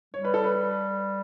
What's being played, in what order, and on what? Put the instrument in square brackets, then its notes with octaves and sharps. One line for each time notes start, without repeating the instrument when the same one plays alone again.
[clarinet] G3 [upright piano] C#5
[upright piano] B4
A4
B4